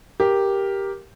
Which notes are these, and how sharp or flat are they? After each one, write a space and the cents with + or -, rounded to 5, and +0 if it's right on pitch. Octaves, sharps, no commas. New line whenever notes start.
G4 +0 A#4 +5